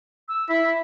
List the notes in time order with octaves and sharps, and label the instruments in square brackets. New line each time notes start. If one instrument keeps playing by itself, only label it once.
[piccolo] E6
[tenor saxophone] E4 [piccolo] B6